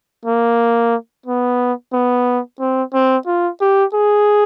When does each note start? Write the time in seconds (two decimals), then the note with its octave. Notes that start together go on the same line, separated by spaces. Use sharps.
0.25 A#3
1.26 B3
1.93 B3
2.60 C4
2.94 C4
3.27 F4
3.61 G4
3.94 G#4